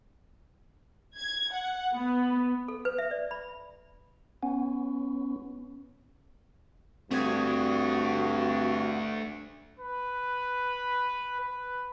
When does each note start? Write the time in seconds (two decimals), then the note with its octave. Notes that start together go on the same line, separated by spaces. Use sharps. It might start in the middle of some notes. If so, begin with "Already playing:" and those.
1.16 G#6
1.52 F#5
1.95 B3
2.68 A4
2.85 B4
2.98 E5
3.11 D5
3.31 B5
4.43 B3 C#4
7.11 G2 A3 C4 D4 F#4 D#6 G#6
9.80 B4
11.40 B4